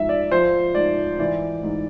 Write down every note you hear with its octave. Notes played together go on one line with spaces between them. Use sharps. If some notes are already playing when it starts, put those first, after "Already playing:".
Already playing: G#2 F3 E5
D5
F3 C5
G#2 D5
E3 D5
G#2